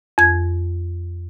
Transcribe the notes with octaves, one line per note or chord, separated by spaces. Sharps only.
F2 G#6